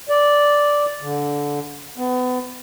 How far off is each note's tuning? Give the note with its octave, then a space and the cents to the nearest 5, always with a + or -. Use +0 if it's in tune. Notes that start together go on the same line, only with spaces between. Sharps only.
D5 -5
D3 -20
B3 +30